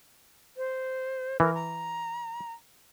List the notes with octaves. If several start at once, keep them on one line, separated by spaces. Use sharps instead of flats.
C5
E3 A#4
A#5